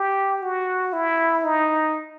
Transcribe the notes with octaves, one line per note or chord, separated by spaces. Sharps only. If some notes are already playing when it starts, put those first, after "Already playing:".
Already playing: G4
F#4
E4
D#4